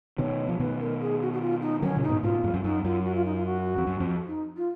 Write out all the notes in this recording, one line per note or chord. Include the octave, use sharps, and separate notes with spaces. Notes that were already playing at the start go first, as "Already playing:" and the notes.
B2 D#3 C#5
F3
B2 D#3 B4
A#4
G#4
F#4
F#4
F4
D#4
D#3 F#3 C#4
A#2 C#3
D#4
G#2 B2
G#2 B2 F4
F2 G#2
F#2
F#2 D#4
F#2 F4
F#4
F4
D#4
F4
F#4
F2
F#2
F2
D#4
F4